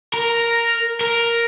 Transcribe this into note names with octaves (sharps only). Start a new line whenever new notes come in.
A#4
A#4